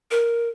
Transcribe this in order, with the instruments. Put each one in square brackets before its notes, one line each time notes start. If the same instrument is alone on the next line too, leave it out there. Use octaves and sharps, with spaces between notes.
[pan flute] A#4